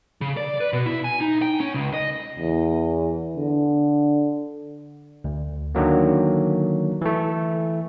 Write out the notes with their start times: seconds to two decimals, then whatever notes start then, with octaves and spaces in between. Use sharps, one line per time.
0.21 C#3
0.37 D5
0.60 B4
0.73 B2
0.86 E4
1.04 G#5
1.21 D#4
1.42 G5
1.60 C#4
1.74 C#2
1.93 D#5
2.39 E2
3.37 D3
5.24 D2
5.75 D3 D#3 F#3 A#3
7.02 E3 A3